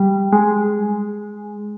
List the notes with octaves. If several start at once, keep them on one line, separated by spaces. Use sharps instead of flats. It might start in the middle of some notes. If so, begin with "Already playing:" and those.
Already playing: G3
G#3